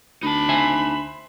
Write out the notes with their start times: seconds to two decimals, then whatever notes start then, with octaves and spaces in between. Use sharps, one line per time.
0.23 D2 D#4 A5 B5
0.49 C5 E5 G#5